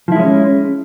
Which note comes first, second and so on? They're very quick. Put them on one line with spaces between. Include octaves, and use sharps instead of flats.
F3 E4 G#3 C#4